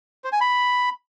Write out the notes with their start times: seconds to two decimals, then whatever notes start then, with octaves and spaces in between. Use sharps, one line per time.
0.24 C5
0.33 G#5
0.41 B5